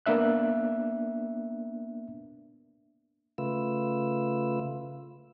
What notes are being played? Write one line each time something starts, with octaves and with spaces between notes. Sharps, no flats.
A#3 B3 D4 E5 F#6
C#3 A3 F4 B4 E6